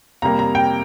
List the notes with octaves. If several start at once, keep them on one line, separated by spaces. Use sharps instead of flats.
F2 C3 G3 A#3 A#5
A#5
G5